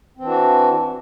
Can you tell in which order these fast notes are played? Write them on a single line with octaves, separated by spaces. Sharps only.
C4 E3 D4 F#4